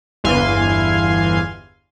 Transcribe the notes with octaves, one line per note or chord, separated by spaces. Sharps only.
G1 E2 E3 F5 G#5 C6